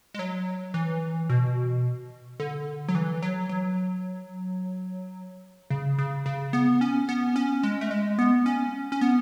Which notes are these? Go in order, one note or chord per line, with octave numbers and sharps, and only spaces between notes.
G#3
F#3
E3
B2
D3
F#3
E3
F#3
F#3
C#3
C#3
C#3
B3
C#4
B3
C#4
G#3
A3
G#3
B3
C#4
C#4
B3